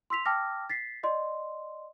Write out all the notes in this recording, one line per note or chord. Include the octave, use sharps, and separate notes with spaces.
C6 E6 B6 F7
G5 A5 D6 E6 F6 A#6
A6 B6 C7
D5 D#5 C6